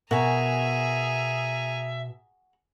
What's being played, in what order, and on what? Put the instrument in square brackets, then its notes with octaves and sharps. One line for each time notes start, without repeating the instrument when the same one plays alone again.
[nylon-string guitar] B2 A#4 [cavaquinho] F#4 G#5 [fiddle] G#4 A#5 [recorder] E5